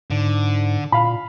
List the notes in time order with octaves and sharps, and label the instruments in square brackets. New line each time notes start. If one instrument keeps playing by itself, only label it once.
[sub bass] G#2 [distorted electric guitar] D3
[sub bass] A#2 [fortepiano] F5 B5